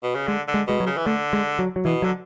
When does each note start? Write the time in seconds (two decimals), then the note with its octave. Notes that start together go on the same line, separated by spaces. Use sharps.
0.03 B2
0.15 C#3
0.28 D3 G#3
0.48 D3
0.54 G#3
0.68 B2 G#3
0.80 F#3
0.86 C#3
0.97 E3
1.06 D3 A3
1.33 G#3
1.59 F#3
1.76 F#3
1.85 B2 E3
2.02 D3 F#3